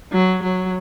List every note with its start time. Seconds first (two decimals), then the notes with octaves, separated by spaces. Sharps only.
0.12 F#3
0.43 F#3